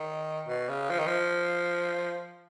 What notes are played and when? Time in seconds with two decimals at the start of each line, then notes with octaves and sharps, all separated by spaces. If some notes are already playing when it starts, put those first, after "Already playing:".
Already playing: D#3
0.48 B2
0.69 C#3
0.90 F3
0.99 D#3
1.07 F3